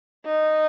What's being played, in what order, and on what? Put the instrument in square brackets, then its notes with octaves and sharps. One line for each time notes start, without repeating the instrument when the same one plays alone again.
[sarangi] D#4